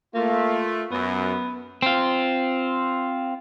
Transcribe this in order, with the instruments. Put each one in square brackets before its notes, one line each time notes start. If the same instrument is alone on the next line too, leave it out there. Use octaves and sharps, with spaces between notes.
[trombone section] A3 F4 [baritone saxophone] A#3
[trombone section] F#2 [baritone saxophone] B3
[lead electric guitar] C4 F4